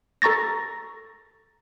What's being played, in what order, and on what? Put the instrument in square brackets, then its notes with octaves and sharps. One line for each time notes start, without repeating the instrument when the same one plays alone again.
[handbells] A4 A#5 C#6 A6 A#6